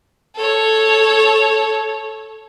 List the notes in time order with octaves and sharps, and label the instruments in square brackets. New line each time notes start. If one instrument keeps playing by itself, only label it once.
[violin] A4 C#5